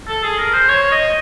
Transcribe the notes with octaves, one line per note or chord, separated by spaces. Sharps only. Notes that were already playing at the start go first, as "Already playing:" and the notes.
A4
G#4
A#4
C5
C#5
D#5